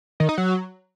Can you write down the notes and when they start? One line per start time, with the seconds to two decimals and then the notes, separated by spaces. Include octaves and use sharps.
0.20 D#3
0.29 D#4
0.38 F#3